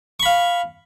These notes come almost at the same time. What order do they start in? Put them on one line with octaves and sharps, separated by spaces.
C#6 B5 F5